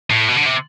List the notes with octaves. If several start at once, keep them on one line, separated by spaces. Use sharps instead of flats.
A2
B2
D3
C3